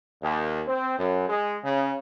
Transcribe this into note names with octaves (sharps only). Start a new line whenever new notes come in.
D#2
C4
F#2
G#3
C#3